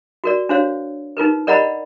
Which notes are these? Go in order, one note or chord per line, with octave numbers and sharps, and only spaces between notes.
F#4 A#4 D5
D4 F#4 C5 C#5 F5
D#4 F4 A#4 B4
A#4 D5 D#5 F#5 A#5 B5